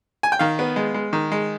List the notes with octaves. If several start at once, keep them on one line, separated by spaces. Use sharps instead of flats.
G#5
G5
D#3 F5
B3
G#3
G#3
D#3
G#3